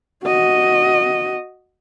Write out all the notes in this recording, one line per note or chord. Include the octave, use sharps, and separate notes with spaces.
F#4 D#5